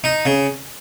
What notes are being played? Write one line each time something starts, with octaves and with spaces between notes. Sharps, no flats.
D#4
C#3